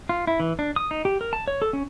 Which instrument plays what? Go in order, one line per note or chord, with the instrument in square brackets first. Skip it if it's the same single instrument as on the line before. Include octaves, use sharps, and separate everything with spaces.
[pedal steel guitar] F4
E4
E3
D4
D#6
D#4
G4
A#4
A5
C#5
A4
C#4